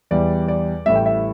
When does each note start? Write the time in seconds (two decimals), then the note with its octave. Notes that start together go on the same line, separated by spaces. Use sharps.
0.11 E2 E3 G3 D5
0.48 D5
0.86 A1 A2 G3 E5
0.95 G5
1.06 E5